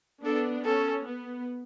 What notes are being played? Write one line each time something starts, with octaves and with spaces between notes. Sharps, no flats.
B3 D4 A4
C#4 A4
B3